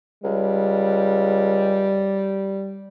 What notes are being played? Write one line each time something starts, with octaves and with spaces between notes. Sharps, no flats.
C#2 G3